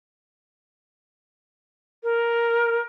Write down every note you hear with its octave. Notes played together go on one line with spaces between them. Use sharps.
A#4